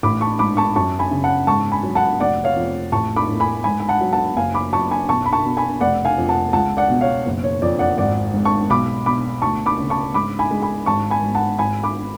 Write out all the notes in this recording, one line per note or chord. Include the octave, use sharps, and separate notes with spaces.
A1 B5 D6
A5 C#6
G#2 B5 D6
A5 C#6
F#2 A5 C#6
G#5 B5
C#3
F#5 A5
G#2 A5 C#6
G#5 B5
F#3
F#5 A5
F1 D5 F#5
C#5 F5
F2
A1 A5 C#6
B5 D6
A2
G#5 B5
G#2 G#5 B5
G#5
F#5 A5
F#3
F#5 A5
F#1 F5 G#5
B5 D6
F#2 A5 C#6
G#5 B5
B1 A5 C#6
B5
A5 C#6
B2
G#5 B5
F1 D5 F#5
F5 G#5
F2
F#5 A5
C#2 F#5 A5
D5 F#5
B2
C#5 F5
F#1
C#5
F2 D5
D5 F#5
G#1 D5 F#5
G#2
A5 C#6
B1 B5 D6
B2 B5 D6
D2 A5 C#6
B5 D6
C#3
A5 C#6
G#2 B5 D6
G#5 B5
G#3
G#5 B5
G#1 A5 C#6
G#5 B5
G#2
F#5 A5
G#1 G#5 B5
B5 D6